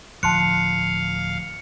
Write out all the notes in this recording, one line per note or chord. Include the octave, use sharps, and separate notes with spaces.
D1 F3 F5 A5 C6 F#6 C#7